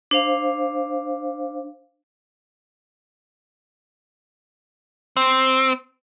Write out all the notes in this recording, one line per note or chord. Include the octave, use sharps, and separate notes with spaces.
D4 C5 F5
C4